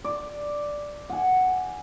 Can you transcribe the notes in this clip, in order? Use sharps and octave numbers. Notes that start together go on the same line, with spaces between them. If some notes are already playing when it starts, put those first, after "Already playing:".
D5
F#5 G#5